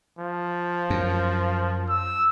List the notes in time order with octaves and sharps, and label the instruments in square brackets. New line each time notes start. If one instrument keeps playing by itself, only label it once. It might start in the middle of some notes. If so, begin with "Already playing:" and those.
[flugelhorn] F3
[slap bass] F#2
[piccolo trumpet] E6